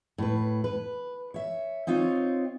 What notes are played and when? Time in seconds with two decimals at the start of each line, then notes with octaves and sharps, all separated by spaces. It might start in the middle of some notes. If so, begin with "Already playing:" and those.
0.18 A2 B4
0.64 B4
1.34 C#5 E5
1.87 C4 D#4 F4 C#5